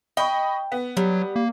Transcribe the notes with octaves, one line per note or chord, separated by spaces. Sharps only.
D#5 G5 B5 C#6
B3
F#3 G3
A#3